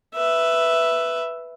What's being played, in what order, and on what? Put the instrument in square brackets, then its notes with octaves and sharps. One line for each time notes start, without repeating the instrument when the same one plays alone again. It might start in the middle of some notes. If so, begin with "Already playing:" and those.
[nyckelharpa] B4 E5